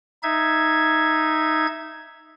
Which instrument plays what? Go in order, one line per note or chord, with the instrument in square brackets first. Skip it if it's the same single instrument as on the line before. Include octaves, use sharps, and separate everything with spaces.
[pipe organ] D#4 E5 G#6